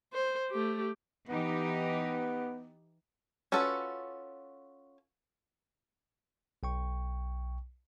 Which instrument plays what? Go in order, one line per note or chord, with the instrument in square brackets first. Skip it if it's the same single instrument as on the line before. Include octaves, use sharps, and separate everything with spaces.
[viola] C5
A3 G4
[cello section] E3 D#4 G4 [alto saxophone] B3
[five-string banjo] C#4 F4 F#4 A4 B4
[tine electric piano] B1 G5 C#6